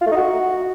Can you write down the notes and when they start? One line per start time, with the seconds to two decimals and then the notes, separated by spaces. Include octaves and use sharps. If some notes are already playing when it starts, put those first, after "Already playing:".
0.01 F4
0.06 A3
0.11 D#4
0.16 F#4